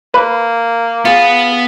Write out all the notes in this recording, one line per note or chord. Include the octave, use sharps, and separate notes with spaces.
A#3 B4
B3 F4 G#4